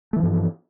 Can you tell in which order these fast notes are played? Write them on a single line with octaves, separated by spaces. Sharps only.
A3 E3 F3 G2